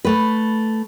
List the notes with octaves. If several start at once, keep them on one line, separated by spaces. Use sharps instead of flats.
A3 B4